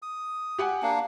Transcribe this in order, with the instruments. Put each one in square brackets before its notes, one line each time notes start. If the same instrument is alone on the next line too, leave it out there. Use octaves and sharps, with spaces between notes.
[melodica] D#6
[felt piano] G4 F#5 G#5
[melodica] A#3 D4